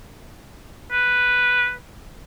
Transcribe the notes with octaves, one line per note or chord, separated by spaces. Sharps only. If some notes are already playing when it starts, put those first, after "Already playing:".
B4